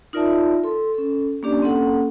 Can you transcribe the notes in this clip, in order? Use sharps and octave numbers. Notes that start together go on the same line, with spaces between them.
D#4 F4 A#4 D5 E5 A5
A4 C6
C#4 A4
A#3 C#4 D4 G4 D5
A#3 C4 C#4 A4 F#5